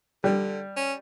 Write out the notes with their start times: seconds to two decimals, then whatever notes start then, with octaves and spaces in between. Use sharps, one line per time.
0.24 D3 G3
0.77 C#4